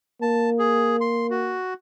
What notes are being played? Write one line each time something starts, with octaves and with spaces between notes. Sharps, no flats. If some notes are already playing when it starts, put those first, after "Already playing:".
A#3 A5
G#4
C6
F#4